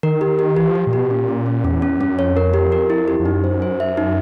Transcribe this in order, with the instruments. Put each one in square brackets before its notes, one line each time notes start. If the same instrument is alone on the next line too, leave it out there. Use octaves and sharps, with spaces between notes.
[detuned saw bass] D#3 [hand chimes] A#4
[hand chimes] G4
G4
[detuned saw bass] E3 [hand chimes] G4
[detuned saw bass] F3 [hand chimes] G4
[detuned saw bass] A#2
[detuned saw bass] B2 [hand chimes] G4
[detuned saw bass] A#2 [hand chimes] C#4
[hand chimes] C#4
C#4
[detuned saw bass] E2 [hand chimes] C#4
[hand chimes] C#4
[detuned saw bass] G2 [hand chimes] C#4
[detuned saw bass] F#2
[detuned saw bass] F2 [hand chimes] C#5
[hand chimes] A#4
G4
A#4
E4
G4
[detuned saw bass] F2
[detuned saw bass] F#2 [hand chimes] D#4
[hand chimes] C5
C5
E5
D#4